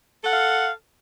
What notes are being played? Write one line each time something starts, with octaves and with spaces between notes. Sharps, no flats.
A4 F5 F#5